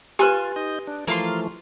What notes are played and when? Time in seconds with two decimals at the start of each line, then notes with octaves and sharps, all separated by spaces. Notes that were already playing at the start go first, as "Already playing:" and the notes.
0.19 F4 G4 B4 G#5 C6 F#6
0.56 D#4 D#5
0.87 D4
1.07 E3 F3 A3 A#3 F4 C6